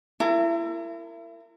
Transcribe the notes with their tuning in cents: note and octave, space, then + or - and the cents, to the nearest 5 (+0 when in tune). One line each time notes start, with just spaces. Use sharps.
E4 +30 A#4 -30